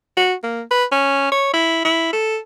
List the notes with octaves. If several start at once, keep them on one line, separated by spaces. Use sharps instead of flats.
F#4
A#3
B4
C#4
C#5
E4
E4
A4